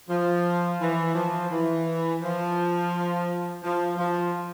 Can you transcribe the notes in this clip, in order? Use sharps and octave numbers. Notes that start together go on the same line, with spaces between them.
F3
E3
F3
E3
F3
F3
F3